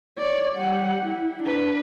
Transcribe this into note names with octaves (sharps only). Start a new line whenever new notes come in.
C#5 D5
G3 F#5
E4
D4 B4